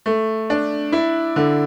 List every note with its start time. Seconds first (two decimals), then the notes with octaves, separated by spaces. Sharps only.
0.06 A3
0.50 D4
0.92 E4
1.36 D3